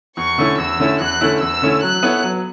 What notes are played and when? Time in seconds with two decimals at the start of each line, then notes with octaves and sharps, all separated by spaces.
0.17 E2 C#6
0.38 D3 A3 C#4 E4
0.58 E2 E6
0.79 D3 A3 C#4 E4
1.00 E2 F#6
1.21 D3 A3 C#4 E4
1.41 E2 E6
1.62 D3 A3 C#4 E4
1.83 F#3 F#6
2.03 B3 E4 A4 C#5
2.24 F#3